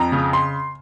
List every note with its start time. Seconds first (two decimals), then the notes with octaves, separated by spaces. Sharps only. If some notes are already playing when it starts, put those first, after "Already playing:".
Already playing: F2 A#5
0.12 C#3
0.33 C6